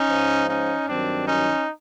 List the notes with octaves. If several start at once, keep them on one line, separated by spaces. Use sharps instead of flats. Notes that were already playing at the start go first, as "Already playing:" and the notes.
Already playing: C#4 D#4
G#2 F3
C#4 D#4
G2 D#3 F#3 C4 D4
C#4 D#4